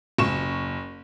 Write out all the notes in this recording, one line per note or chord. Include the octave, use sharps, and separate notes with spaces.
F#1 C#6 E7